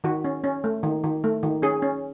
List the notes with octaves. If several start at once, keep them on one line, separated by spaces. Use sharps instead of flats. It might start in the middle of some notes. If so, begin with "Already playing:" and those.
D#3 F#4
C#4
C#4
A3
D#3
D#3
A3
D#3
C#4 G#4
C#4